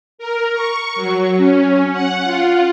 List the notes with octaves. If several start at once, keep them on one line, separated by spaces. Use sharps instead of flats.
A#4
C#6
F#3
C#4
F#5
F4